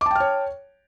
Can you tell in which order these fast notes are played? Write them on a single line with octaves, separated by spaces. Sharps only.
D6 A5 G5 F6 C#5